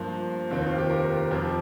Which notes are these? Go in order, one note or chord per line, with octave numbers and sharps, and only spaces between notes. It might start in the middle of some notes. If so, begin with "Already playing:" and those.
Already playing: G2 F3 A#3 C5
F1 D#2 D#3 C4
F4
G4
A#4
F2 F3 C4 G4